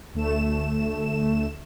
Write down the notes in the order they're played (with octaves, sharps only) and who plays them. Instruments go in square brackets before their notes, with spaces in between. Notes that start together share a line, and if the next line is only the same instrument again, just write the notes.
[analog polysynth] D2 A3 E7